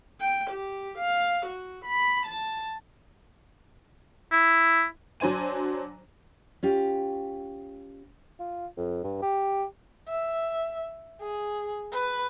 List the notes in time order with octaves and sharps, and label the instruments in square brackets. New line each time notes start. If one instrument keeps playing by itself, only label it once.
[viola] G5
G4
F5
F#4
B5
A5
[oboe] E4
[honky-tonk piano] F#3 D4 C5 G#5 D#7
[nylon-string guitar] C#4 F4 G4
[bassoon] F4
F2
G2
G4
[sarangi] E5
G#4
B4